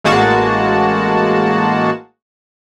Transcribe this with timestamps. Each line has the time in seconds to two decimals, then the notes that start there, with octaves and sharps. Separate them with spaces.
0.04 A1 G#3 A#3 F#4 A5